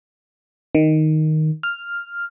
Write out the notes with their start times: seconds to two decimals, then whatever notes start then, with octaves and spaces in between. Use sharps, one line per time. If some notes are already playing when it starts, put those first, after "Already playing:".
0.75 D#3
1.63 F6